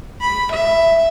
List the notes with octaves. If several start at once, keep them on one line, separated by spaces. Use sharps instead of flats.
B5
E5